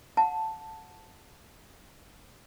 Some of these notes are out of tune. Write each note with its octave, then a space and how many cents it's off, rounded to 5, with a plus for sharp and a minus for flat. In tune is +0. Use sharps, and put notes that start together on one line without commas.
F#5 -30 A5 +0